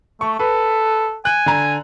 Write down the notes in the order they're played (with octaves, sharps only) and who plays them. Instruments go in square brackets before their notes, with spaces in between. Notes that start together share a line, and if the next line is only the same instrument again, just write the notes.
[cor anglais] A3 [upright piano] C#6
[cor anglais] A4 [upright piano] B4
[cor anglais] G#5 [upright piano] F#6
[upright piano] D3 A#5